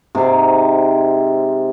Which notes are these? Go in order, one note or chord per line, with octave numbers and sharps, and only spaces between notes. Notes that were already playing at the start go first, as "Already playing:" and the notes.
G#2 C3